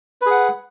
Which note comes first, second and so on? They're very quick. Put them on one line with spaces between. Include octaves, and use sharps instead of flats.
B4 G#4 F#5